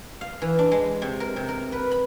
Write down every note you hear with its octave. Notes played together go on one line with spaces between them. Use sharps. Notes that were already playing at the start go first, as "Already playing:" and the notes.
F5
E3
D4
G#3
C3
A#4
C3
A#4
B4
B5